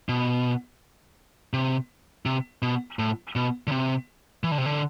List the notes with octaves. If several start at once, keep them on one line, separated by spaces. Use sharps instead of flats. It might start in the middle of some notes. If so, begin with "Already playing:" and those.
B2
C3
C3
B2
A2
B2
D3
C3
E3
D3
C3
D3